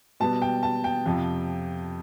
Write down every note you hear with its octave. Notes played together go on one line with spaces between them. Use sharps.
B2 G3 B3 A5
G5
A5
G5
F2 C3 F3